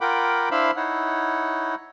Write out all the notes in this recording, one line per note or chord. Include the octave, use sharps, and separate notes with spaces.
F4 A#4 F#5 G5 B5 D6
D4 E4 C5 E5 F5 B5
D#4 E4 C#5 F#5